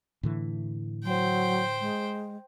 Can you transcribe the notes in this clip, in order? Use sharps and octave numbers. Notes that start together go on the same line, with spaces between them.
A2 D3 E3
F#3 C5 G5
G#3